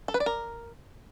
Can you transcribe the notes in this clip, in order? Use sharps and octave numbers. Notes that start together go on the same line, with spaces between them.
A4
B4
D5
A#4